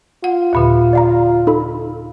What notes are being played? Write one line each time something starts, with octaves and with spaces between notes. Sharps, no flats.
F4 F#5
D#2 A#2 D3
D5 F5 A#5
D#4 A4 B5